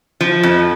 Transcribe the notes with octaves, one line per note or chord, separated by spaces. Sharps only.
F3
F2